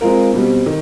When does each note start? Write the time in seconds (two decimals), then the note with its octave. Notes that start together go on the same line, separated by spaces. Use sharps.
0.01 G#3 C4 F4 A#4
0.34 B2 G3 C4
0.66 D#3